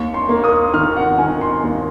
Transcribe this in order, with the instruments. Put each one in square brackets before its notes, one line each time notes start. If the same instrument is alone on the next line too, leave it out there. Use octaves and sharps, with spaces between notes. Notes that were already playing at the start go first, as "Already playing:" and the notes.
Already playing: [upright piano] D#2 C#6
C6
A#3
D#6
D#3 F6
F#5
D#3 G#5
C6
D#2